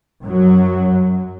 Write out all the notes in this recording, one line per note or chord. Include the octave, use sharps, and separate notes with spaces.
F#2 F#3